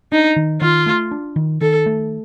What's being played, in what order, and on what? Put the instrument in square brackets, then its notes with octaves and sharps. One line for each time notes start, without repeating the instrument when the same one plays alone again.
[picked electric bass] D4 [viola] D#4
[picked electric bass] D#3
[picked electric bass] D#3 [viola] F4
[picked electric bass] A3
D4
D#3
[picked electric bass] D#3 [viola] A4
[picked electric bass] A3